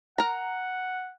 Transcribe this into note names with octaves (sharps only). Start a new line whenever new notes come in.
A#4 F#5 A#5